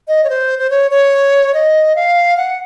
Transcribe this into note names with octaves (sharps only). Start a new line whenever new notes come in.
D#5
C#5
C5
C5
C#5
C#5
D#5
F5
F#5